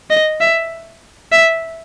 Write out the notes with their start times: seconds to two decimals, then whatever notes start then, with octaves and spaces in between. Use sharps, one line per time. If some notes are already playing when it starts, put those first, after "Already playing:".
0.10 D#5
0.41 E5
1.32 E5